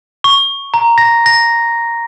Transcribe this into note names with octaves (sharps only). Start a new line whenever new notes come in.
C#6
A#5
A#6
A#6